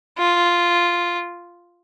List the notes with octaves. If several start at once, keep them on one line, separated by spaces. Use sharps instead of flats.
F4